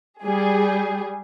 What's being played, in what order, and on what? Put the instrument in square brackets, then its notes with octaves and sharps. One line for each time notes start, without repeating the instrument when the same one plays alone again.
[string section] G3 G#4